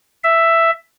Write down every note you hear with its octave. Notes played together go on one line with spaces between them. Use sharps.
E5